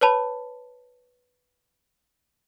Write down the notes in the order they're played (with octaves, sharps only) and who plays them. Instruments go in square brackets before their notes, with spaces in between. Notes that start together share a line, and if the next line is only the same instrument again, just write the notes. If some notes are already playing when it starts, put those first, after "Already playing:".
[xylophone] B4 C#5 A5 B5